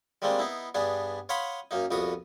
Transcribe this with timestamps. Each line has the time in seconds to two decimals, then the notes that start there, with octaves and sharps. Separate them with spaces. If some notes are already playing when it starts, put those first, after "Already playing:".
0.22 G3 G#3 A#3 C4 D4
0.39 B3 D#4 E4
0.75 G2 B3 D4 G#4
1.29 C#5 F5 F#5 B5 C6 D#6
1.71 F#2 A#3 D#4
1.91 C2 F2 B3 F#4 D#6